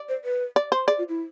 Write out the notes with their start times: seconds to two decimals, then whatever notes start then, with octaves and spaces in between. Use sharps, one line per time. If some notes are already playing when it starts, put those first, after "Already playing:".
Already playing: D5
0.09 C5
0.25 B4
0.56 D5
0.72 C5
0.87 G#4 D5
0.98 F4
1.09 E4